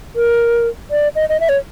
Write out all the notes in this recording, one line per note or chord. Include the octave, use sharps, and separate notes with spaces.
A#4
D5
D#5
D#5
E5
C#5